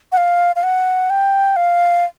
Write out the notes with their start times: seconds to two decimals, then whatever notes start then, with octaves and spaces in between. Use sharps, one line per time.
0.12 F#5
0.17 F5
0.56 F5
0.63 F#5
1.10 G5
1.56 F5